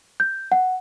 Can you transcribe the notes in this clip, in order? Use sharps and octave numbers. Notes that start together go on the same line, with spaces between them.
G6
F#5